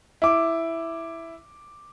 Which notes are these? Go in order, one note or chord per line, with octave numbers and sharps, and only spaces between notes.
E4 D6